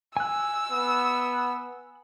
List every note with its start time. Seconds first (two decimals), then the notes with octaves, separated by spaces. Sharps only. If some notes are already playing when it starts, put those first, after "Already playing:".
0.17 G#5 E6 F#6
0.72 B3